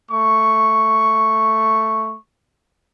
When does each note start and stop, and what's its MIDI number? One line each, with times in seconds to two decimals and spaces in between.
0.12 2.17 57
0.12 2.17 85